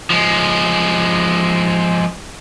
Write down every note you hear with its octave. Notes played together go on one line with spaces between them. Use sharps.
F3 G#3